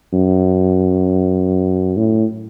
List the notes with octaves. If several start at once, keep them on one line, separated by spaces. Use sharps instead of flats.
F#2
A2